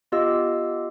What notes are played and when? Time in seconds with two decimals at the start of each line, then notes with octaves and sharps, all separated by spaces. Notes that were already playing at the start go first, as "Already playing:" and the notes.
0.12 B3 F4 G4 D#5 F5 E6